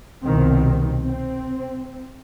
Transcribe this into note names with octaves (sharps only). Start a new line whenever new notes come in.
C2 B2 D#3 C4
C4